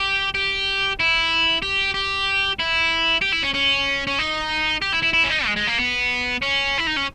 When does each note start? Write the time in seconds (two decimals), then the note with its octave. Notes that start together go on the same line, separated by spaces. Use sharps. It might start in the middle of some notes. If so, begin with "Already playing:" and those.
Already playing: G4
0.35 G4
1.00 E4
1.62 G4
1.94 G4
2.59 E4
3.22 G4
3.33 E4
3.43 C#4
3.54 C#4
4.07 C#4
4.19 D#4
4.82 G4
4.93 E4
5.03 E4
5.13 E4
5.24 C#4
5.30 D#4
5.46 G#3
5.56 G#3
5.67 A#3
5.78 B3
6.42 C#4
6.78 E4
6.87 D#4
6.96 C#4